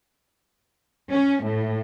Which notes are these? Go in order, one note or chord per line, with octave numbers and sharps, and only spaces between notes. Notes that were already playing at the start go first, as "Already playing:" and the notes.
C#4
A2